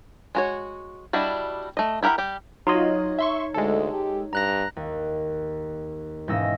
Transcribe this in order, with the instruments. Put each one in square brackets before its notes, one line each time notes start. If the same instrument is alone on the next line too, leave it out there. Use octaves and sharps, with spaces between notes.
[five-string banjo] G#3 F#4 C#5
G3 D4 E4 F#4 D#5
A3 D#5
E4 G4 A#4 F#5 B5
G3 G4
[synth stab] F#3 F4 D#5 [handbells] D#4 C#5
[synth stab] E5 C6 C#6
[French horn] D2 [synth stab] G#3 A4
[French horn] G4
[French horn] G2 [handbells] A#5 F#6 A#6
[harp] D#2
E1 G#2 C#4 D#5 E6 A#6